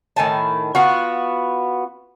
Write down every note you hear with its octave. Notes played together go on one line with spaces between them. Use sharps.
A2 D#3 G#5 A5
B3 F4 F#4